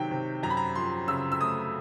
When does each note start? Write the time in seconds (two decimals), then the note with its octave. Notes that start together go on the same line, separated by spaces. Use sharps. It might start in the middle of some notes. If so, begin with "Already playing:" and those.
Already playing: C3 D#3 F#3 G5
0.11 C3
0.43 F#2 A#5
0.50 B5
0.57 A#5
0.75 F3 C6
1.08 C#3 E6
1.32 E6
1.40 A3 D#6